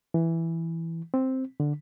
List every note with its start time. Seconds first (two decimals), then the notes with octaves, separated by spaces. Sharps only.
0.14 E3
1.14 C4
1.60 D3